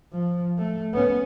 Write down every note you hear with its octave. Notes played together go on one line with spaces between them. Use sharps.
F3
A3
B3 C#4